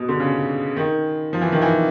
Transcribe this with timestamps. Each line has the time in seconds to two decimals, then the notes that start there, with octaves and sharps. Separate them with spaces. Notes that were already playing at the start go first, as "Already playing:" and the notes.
Already playing: B2
0.09 D3
0.20 C#3
0.77 D#3
1.33 F3
1.41 E3
1.52 D#3
1.62 E3